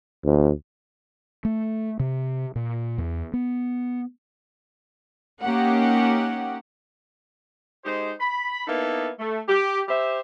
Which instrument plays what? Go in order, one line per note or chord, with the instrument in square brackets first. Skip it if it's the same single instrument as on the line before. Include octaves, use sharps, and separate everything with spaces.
[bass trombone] D2
[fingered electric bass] A3
C3
A#2
E2
B3
[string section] A#3 C#4 D#4 G4 F#5
[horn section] G#3 D#4 G4 C5
B5
A#3 B3 D#4 E4 A4
A3
G4
G4 C5 E5